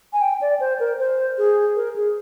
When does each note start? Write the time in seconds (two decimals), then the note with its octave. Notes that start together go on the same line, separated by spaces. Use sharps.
0.13 G#5
0.21 G5
0.41 D5
0.60 C5
0.80 A#4
0.99 C5
1.38 G#4
1.76 A#4
1.96 G#4